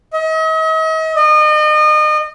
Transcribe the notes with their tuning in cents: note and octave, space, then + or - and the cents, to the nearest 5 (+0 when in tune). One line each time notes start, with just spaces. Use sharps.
D#5 +40
D#5 -35